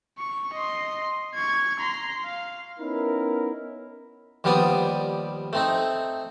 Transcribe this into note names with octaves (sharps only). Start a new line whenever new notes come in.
C#6
D#5 C6
C#6 G#6
A#5 C6
F5
B3 C#4 D#4 E4 A#4
D#2 F3 G3 B3 D5 D#6
A3 C4 D#4